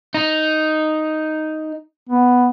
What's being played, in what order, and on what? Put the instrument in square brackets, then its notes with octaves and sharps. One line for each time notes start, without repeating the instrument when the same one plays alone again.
[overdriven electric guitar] D#4
[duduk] B3